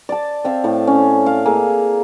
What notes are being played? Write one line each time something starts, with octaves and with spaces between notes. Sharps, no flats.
D5 A5
C4 E5 F5
A2 A5
C#4
F5 D6
A#3 G#4 A4